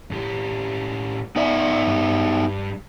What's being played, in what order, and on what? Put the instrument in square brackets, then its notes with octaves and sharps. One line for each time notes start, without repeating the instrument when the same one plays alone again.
[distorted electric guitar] A2 G4
[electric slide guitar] B3 D#4 E5 [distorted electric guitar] D5 G#5
[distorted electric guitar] G2 G3